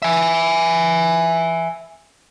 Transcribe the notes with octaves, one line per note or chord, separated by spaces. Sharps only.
E5 G#5